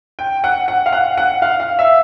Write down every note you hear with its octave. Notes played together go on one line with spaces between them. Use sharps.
G5
F#5
F#5
F5
F#5
F#5
F5
F5
E5